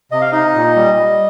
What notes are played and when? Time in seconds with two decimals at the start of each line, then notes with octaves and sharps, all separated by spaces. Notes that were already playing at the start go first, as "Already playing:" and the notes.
0.12 C3 D#5
0.21 F5
0.32 D#4 D#5
0.54 A#2
0.76 G3
0.98 G3